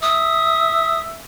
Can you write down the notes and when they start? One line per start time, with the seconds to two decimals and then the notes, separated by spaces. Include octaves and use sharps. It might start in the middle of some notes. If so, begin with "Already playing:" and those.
0.02 E5 D#6